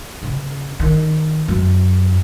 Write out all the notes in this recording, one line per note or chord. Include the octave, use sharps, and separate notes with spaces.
C#3
D#3
F#2